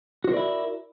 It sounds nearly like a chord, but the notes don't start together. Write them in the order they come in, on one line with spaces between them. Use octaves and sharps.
F#4 C5 A#4 D5 E4